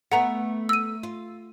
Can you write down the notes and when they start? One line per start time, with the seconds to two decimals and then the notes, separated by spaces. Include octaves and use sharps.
0.12 A3 B3 F#5 A#5
0.69 E6 D#7
1.03 F4